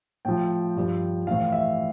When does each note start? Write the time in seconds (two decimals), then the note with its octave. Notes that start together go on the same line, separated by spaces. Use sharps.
0.25 A2 F3 G5
0.76 G2 F3
1.27 A2 E3 F5
1.52 E5